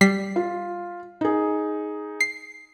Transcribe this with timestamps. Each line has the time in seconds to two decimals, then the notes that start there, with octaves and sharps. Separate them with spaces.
0.01 G3 B6 C7
0.36 F4
1.21 D#4 G#4
2.20 C7